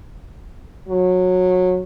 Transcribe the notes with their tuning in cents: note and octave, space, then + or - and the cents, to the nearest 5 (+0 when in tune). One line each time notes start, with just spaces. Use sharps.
F#3 -20